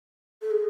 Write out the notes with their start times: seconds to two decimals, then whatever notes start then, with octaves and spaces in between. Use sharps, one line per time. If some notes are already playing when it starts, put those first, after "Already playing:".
0.42 A4
0.51 G#4